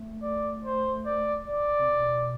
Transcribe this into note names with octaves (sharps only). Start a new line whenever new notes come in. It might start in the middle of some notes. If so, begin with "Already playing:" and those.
Already playing: A3
D5
C5
D5
D5
C3
B2